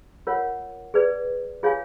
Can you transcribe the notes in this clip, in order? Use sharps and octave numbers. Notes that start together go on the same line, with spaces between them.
F4 A#4 C#5 F#5
G#4 B4 D5
F4 G#4 C#5 F5 G#5